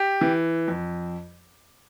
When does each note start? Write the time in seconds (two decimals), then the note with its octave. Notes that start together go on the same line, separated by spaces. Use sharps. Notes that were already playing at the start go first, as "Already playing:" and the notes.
Already playing: G4
0.21 E3
0.68 F2